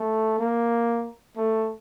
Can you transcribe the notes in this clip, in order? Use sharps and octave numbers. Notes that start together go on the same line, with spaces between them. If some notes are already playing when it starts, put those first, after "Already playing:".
Already playing: A3
A#3
A3